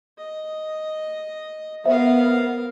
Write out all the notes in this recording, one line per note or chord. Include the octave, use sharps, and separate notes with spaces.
D#5
B3 A#4 C5 E5 F5